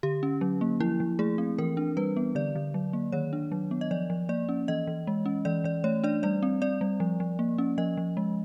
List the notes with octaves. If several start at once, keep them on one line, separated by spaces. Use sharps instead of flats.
D3 G4
C#4
F#3
A#3
F3 E4
F3
A3 G#4
C4
E3 A#4
D4
G3 B4
B3
D3 D5
D3
F#3
A#3
D#3 C#5
D4
F#3
B3
D#5
F3 D5
F3
A#3 D5
C#4
E3 D#5
E3
G#3
C#4
E3 D5
E3 D5
A3 C#5
D4 D5
G3 D5
C4
C4 D5
G3
F3
F3
A#3
C#4
F3 D#5
F3
G#3